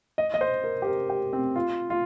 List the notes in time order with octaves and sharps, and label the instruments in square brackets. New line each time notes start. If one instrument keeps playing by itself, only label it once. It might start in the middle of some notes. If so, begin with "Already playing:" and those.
[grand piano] D#5
D#5
C5
A#4
G4
A#4
G4
C4
F4
F4